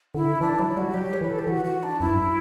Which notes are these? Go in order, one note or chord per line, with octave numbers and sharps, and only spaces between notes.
D3 E4
E3 D4
F#3 E4
G3 F#4
F#3 G4
C#5
E3 B4
A4
G4
E3 F#4
F#4
D4
F#2 E4
G2
F#2